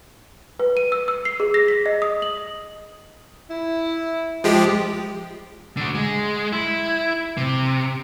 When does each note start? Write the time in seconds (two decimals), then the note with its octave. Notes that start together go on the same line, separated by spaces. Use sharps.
0.60 B4
0.77 D#7
0.92 E6
1.08 E6
1.25 C7
1.40 G#4
1.54 A#6
1.68 B6
1.86 D#5
2.02 D#6
2.22 F#7
3.50 E4
4.44 F3 G#3 G4
5.77 D3 F#4
5.95 G#3
6.53 E4
7.37 C3